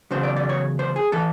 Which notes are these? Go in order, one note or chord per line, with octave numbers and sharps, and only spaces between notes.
E2 C#3 F#3 C5
D5
D5
C#5
C5
G#4
E3 A4